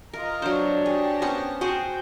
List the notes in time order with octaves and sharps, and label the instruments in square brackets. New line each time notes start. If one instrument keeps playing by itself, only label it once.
[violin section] F4 D#5 A#5 [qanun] A#4
[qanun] F#3 C5 [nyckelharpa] D4 C#5
[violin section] G4 A5 A#6 [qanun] G#4
[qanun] B3 C#4 C5
[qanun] F#4 G#4 C5 [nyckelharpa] G5